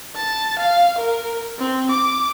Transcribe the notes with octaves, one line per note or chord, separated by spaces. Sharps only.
A5
F5
A#4
C4
D6